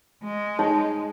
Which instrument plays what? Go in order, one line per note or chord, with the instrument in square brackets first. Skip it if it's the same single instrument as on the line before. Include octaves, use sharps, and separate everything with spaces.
[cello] G#3
[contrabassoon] G#2 [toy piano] D#4 C#5